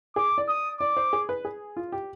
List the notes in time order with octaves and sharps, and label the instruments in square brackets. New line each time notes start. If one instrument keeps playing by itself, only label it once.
[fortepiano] G#4 [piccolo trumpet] D6
[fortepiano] D5
[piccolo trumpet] D#6
[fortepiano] D5 [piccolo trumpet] D6
[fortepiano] C5
G#4
B4
G#4
F4
G4